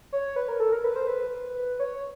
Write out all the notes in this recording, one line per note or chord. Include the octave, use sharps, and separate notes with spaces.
C#5
B4
A#4
A4
A#4
B4
C5
B4
C#5